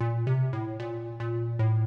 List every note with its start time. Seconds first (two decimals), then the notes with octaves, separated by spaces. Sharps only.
0.01 A#2
0.27 C3
0.53 A2
0.80 A#2
1.20 A#2
1.59 A2